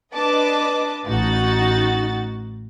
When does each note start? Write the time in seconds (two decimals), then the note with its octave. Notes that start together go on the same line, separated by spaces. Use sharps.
0.13 D4 B4 D#5 A5 D6
1.06 A1 D#4 F#4 A6